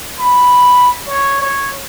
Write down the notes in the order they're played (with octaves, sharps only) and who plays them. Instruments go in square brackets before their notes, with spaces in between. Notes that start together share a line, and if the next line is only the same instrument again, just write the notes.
[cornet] B5
C#5
C#5